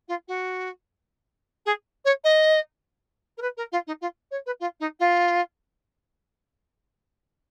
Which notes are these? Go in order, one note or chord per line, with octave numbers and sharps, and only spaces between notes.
F4
F#4
G#4
C#5
D#5
A#4
B4
A#4
F4
D#4
F4
C#5
B4
F4
D#4
F4